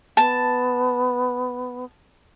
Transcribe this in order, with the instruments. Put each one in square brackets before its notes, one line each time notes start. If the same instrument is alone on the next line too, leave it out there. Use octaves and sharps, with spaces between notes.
[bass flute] B3 [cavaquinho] A5